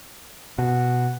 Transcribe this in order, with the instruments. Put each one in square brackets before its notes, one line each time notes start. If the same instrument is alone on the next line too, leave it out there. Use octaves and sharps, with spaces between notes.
[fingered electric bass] B2 [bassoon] F#4